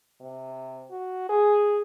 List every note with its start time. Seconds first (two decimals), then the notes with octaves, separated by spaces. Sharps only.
0.20 C3
0.91 F#4
1.29 G#4